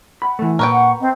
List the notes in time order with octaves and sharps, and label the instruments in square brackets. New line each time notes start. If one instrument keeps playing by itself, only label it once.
[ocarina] F#5 [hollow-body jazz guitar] B5
[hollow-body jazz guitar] E3 A3
[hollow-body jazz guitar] A#2 [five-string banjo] A#4 B4 G5 [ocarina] C#6
[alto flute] F#5
[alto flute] C4 [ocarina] D#5